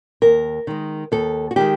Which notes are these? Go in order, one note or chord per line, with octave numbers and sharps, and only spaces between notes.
D#2 A#4
D#3 G#3
D#2 A4
F#4
D#3 G#3 G4